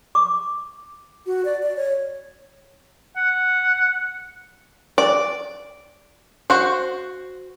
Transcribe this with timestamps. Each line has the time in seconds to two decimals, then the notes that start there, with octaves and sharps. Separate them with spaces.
0.15 D6
1.26 F#4
1.45 D5
1.63 D5
1.77 C#5
3.16 F#5
4.98 D5
6.50 F#4 C5